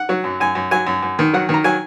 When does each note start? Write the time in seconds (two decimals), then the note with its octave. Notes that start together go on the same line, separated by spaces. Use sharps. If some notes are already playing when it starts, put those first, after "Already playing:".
Already playing: F#5
0.09 F#3
0.24 F#2
0.40 F#2 G#5
0.55 F#2
0.71 F#3 G#5
0.86 F#2
1.02 F#2
1.19 D#3
1.33 F#3 F#5
1.49 D#3
1.54 A#5
1.64 F#3 G#5